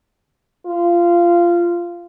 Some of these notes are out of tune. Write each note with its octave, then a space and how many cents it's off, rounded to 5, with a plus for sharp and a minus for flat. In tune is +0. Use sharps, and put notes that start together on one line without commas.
F4 -15